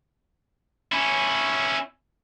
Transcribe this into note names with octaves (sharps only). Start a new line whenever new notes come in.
C#4 E4